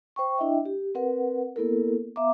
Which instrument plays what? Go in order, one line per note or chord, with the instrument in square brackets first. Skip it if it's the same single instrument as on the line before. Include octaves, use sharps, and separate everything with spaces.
[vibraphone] C5 G5 C#6
D4 E4 D#5 E5 G5
G4
C4 A#4 B4 F#5
A#3 B3 E4 A4 A#4
B3 E5 F5 A#5 D6